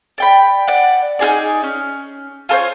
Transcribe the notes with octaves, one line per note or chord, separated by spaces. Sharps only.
D5 G5 B5
D5 F#5
D#4 F4 G#4 D5
C#4
F4 A4 C5 C#5